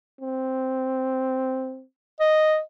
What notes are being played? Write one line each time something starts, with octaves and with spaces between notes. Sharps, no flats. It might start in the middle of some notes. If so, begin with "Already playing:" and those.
C4
D#5